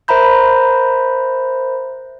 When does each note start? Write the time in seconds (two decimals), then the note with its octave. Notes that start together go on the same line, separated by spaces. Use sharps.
0.08 A#4 C5 E5 A#5 B5 G6